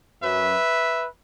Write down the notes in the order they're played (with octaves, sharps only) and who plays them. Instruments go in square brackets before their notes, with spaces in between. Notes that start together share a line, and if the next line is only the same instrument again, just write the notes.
[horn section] F#2 F#3 C#4 B4 E5